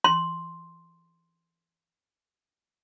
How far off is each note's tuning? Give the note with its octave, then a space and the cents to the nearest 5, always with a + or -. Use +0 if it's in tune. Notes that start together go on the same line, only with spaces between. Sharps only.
C6 +0